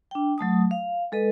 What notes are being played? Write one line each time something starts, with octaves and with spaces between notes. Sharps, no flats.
D4 G5
F#3 A3 A5 D#6
F5
G#3 A4 B4 D#5